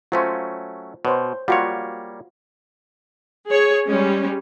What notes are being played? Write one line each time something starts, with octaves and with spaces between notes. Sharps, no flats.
F#3 A3 C#4 F4 C5
B2 C5 C#5
G3 A#3 F4 F#4 C#5
G#4 C#5
G3 G#3 C#4